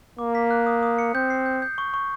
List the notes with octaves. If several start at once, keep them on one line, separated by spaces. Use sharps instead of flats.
A#3 D6
B6
F#6
D#6
D#6
C#7
C4 G6
C7
G6
G6
C#6
C#6